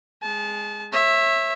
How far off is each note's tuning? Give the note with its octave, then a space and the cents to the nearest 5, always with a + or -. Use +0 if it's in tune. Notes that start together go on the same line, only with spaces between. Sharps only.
G#3 +0 A5 -30
C#5 -35 E5 +0